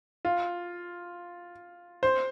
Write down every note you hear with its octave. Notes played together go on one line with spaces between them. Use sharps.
F4
C5